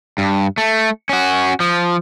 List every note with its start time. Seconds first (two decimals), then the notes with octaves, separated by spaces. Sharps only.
0.18 G2
0.58 A3
1.09 C#4 F#4
1.60 F3